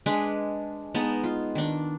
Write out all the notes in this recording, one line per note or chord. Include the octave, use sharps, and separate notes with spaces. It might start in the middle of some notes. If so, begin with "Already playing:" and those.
G#3 D4 B4
G#3 B3 D#4 A5
F4
D#3 D4